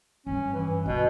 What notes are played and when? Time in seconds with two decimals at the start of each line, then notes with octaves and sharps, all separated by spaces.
0.27 G2 C#4
0.54 E3
0.86 D2 B2